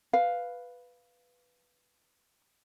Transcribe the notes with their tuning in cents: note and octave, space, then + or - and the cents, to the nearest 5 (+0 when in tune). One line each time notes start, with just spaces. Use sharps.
B4 +0 F5 +0